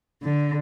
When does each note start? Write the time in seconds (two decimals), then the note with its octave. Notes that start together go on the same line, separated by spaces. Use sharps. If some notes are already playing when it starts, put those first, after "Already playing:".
0.23 D3